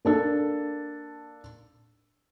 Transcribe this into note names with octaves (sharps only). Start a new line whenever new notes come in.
A#3 D4 A4